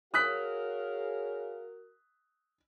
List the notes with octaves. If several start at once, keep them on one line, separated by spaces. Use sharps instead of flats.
F#4 G#4 A#4 C#5 F5 D#6 F#6 B6